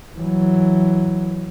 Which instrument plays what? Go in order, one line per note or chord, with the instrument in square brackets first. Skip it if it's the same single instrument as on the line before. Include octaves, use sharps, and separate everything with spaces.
[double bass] E3 F#3